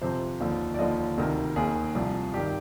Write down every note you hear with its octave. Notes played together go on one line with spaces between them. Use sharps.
F2 C3 F3 C5
D#2 D3 F3
D5
D#2 D3 F3 D#5
D2 C3 D#3
D#2 D#3 G#4
C2 C3 F3
G2 D#3 G4